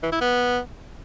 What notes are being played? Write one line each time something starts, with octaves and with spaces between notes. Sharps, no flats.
E3
E4
B3